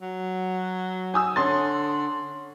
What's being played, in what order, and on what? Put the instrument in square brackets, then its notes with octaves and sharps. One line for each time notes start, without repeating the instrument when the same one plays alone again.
[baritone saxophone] F#3
[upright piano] G#5 D#6 E6
[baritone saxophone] D3 [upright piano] C#4 C6 A6